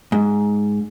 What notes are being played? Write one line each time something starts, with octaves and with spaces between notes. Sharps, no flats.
G#2